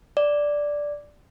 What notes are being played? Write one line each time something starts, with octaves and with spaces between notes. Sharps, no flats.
D5